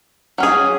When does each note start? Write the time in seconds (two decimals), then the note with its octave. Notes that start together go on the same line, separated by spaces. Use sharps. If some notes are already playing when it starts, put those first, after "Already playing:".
0.38 F#3 C#4 G#4